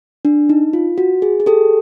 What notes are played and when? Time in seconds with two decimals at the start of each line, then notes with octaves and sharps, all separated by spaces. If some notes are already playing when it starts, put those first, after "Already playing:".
0.25 D4
0.49 D#4
0.73 F4
0.98 F#4
1.22 G#4
1.40 G#4
1.46 G4 A4